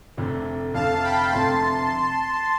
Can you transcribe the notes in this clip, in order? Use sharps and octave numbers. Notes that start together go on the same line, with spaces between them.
F1 F2 D3 A3
F1 F2 D3 A3 F5 A5
G5 B5
F1 F2 D3 A3 A5 C6